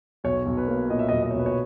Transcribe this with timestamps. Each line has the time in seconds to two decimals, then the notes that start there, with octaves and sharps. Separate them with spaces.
0.24 B1 C#5
0.46 B1
0.57 B4
0.68 A#3
0.90 A#2 D#5
0.99 E5
1.09 B1 D#5
1.23 D#5
1.31 C#5
1.34 B1 B4
1.46 C#5